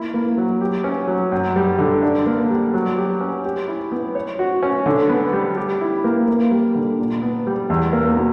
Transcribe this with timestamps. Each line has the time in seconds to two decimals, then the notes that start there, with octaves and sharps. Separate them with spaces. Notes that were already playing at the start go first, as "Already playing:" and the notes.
Already playing: A#3 E4
0.14 A#3
0.38 F#3
0.61 G4
0.84 C#4
1.08 F#3
1.32 F#2
1.56 G3
1.78 D3
2.03 D4
2.26 A#3
2.50 G3
2.74 F#3
2.98 G4
3.20 C#4
3.45 G4
3.68 E4
3.92 B3
4.15 C#5
4.39 F#4
4.63 C#4
4.86 D3
5.09 B3
5.33 G3
5.57 G4
5.81 E4
6.04 A#3
6.28 A#3
6.51 G3
6.75 D3
6.99 A#2
7.22 B3
7.47 G3
7.70 E2
7.93 A#3
8.17 B2